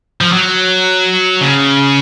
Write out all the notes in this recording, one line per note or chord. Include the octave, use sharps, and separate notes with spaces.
F3
F#3
C#3